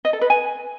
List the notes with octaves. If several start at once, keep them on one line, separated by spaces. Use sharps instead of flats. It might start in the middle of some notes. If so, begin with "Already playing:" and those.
D#5
A4
B4
G#5